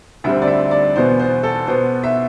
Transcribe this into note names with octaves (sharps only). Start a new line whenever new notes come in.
D2 D3 G3 C4 E5
D5
E5
D5
E2 B2 B3 C5
C5
A4
B2 B3 C5
E5